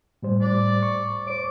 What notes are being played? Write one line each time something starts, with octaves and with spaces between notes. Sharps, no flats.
A2 G3 C5
D5
C#6
C5 C#5 D6